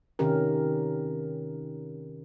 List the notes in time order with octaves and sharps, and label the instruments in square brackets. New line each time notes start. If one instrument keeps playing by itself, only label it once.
[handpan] C3 D#3 C#4 G4 A#4